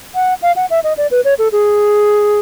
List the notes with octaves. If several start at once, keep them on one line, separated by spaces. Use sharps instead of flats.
F#5
F5
F#5
E5
D#5
D5
B4
C#5
A4
G#4